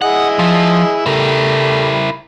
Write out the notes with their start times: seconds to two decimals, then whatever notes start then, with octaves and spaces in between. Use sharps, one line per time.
0.02 E4 G#4 D#5 F#5
0.39 F3
1.06 G3 A3 E4 A#4